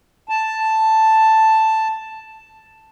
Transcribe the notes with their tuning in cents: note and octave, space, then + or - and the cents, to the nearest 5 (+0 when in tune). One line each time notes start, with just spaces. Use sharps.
A5 +0